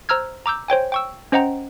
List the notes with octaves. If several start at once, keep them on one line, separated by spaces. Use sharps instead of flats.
C5 A#5 E6 F6 G#6
A#5 D6 E6 G6
C5 C#5 G5 G#5
G5 C#6 E6
C#4 C5 D#5 F#5 G5 A#5